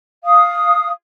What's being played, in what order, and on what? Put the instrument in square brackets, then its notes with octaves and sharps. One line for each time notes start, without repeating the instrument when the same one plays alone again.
[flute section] F5 D#6